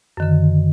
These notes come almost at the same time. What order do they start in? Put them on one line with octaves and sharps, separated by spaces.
F#2 D#3 D3